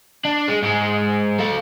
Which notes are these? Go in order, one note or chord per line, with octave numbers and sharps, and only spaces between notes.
D4
G#3
G#2 G#3
A4 F5